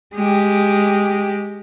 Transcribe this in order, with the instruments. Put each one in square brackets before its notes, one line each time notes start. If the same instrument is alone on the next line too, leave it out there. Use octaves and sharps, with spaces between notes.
[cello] G#3 G4